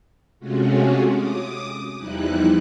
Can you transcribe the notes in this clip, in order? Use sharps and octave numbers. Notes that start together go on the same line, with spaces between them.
C3 G#3 A3 C#4 F4 F#4
D6 D#6
E2 F3 G3 D#4 E4 F#6